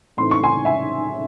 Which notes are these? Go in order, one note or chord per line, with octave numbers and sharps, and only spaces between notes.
A2 E3 A3 C4 D#4 C6
C#6
G#5 C6
E5 G#5